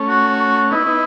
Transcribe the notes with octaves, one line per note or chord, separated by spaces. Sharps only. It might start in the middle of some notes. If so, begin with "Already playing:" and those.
Already playing: A3 C#4
F#4
B3 D#4 E4
B3 D#4